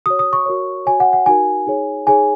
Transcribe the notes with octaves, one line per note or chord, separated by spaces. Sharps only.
F#4 C#5 D#6
D#6
C#6
F#4 A#4 C#5
F#4 C#5 G#5
F#5
F#5
D#4 F#4 A#4 G#5
D#4 G#4 C#5
D#4 G#4 C#5 G#5